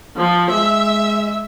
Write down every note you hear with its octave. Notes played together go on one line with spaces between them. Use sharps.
F3
G#3 E5